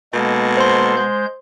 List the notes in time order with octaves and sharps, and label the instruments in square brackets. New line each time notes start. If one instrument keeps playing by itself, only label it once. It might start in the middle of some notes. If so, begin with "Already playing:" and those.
[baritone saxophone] B2 [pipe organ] G#3 A#3 A4
[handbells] C5 C6
[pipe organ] G#3 G6